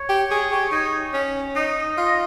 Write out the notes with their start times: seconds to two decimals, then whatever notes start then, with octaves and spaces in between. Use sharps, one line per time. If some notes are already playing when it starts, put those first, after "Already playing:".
Already playing: C#5
0.09 G4
0.31 G#4
0.52 G4
0.72 D#4
1.14 C#4
1.56 D#4 D#5
1.97 F4